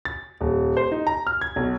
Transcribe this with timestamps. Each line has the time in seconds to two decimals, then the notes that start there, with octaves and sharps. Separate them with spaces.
0.05 A6
0.41 D#1
0.77 C5
0.92 D#4
1.07 A#5
1.27 F6
1.41 G#6
1.56 B1